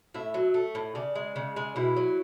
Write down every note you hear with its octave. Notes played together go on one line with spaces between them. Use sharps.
A2 E5
F#3
A3
A2
C#3 D5
G#3
C#3
G#3
B2 E4
F#3